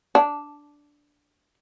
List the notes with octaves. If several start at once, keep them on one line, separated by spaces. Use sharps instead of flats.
D4